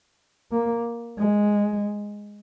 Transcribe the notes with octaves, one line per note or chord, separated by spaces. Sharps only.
A#3
G#3